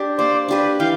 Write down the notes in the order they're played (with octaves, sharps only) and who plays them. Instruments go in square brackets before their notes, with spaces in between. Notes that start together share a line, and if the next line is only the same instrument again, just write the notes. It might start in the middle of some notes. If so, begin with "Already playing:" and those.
Already playing: [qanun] D4 G4
[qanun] A#3 [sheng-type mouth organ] C5 D5
[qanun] D4 G4 B4
[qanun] E3 [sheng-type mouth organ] F5 G5